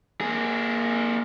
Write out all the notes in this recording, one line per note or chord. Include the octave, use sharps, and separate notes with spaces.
A#3 G#4